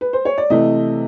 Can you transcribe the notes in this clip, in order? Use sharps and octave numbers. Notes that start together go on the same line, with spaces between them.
B4
C5
C#5
D5
C3 E3 A3 D#5